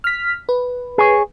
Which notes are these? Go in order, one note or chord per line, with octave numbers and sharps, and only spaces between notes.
F6 B6
B4
G#4 C#5